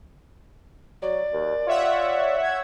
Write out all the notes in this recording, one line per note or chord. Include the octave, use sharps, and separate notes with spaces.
F#3 D5
D#2
F4 C#5 E5 F#5
G#6